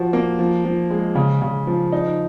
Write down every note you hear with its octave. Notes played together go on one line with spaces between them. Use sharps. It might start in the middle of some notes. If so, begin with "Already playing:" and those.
Already playing: F3 F#4
A#3
F3
F3
G#3
C#3
C#3
F3
D#4